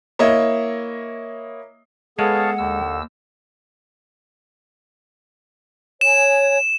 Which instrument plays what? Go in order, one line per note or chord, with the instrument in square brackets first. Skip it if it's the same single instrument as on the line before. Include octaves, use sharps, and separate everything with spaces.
[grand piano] A#3 E4 C#5 D#5 E5
[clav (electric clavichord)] G#3 [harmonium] B3 G#4 A4 [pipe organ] C#5 F5 A5 [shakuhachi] F#5
[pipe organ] D#2 E6 [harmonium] D3
[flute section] C#5 G#5 [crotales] E7